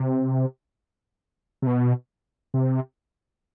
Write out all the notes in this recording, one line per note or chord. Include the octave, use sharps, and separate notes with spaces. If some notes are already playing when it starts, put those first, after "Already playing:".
Already playing: C3
C3
B2
C3